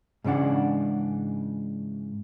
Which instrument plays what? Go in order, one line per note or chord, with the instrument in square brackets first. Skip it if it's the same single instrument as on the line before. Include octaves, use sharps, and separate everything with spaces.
[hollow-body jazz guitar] G#2 C#3 E3 D4 F#5